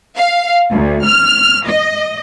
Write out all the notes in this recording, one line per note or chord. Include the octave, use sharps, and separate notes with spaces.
F5
D2
F6
D#5